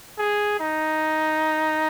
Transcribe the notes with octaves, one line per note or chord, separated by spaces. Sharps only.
G#4
D#4